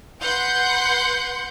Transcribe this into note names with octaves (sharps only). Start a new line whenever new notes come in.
B4 F#5 C6 G6